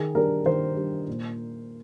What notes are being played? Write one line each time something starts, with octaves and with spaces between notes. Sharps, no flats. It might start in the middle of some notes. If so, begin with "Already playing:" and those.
Already playing: D#3 G#4
G3 D4 A#4
D#3 C5
G3 D4
A#2